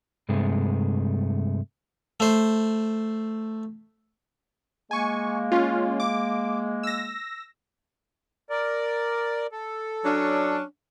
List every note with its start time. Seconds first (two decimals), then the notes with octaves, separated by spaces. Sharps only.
0.29 G2 C3 G#3 A3
2.20 A3 C5
4.91 G#3 A#3 G#5 C#6
5.52 C#4 F4
6.00 D6
6.83 E6 A#6
8.50 A#4 D5
9.52 A4
10.05 F#3 C#4 D4